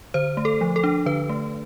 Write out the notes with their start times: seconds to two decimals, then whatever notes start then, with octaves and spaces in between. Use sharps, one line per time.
0.14 D3 C5
0.37 A3
0.45 A4
0.61 F3
0.76 A4
0.84 D4
1.06 D3 B4
1.29 A3